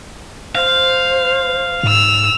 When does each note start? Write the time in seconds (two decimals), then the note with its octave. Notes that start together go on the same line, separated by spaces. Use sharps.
0.55 C5 F5
1.83 G#2 E6 F7